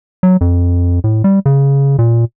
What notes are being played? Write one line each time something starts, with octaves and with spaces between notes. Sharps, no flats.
F#3
F2
A2
G3
C#3
A#2